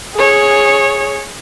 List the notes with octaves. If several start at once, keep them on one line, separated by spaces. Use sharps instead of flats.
G#4 C#5